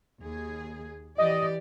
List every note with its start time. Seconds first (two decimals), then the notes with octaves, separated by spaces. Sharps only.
0.22 D#2 G#4
1.18 E3 G4 D5 D#5